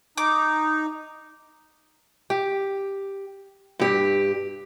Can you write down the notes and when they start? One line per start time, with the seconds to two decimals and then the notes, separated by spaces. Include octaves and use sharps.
0.17 D#4 D6
2.30 G4
3.79 G2 G4